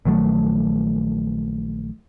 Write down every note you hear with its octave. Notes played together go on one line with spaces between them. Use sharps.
A#1 D#3 F#3 A3